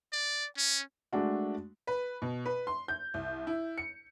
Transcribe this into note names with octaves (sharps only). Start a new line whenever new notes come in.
D5
C#4
G#3 A3 D4 F#4
B4
B2
B4
C6
G6
C2
E4
C#7